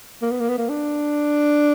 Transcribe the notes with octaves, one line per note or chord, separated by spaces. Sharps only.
A#3
B3
A#3
B3
A#3
D4